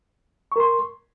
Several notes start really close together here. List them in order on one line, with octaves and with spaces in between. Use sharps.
C#6 A#4 C6